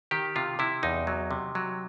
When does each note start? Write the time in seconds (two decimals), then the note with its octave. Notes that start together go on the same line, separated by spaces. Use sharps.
0.11 D#3 G4
0.36 C3 F4
0.59 C3 E4
0.83 E2 D#4
1.07 F#3
1.31 C3
1.55 F#3